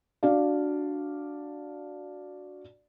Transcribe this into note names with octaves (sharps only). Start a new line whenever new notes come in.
D4 F#4 D5 F5